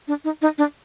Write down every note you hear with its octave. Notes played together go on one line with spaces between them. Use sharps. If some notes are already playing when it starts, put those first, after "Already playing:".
D4
D#4
D#4
D4